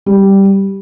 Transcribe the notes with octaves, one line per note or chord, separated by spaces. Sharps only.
G3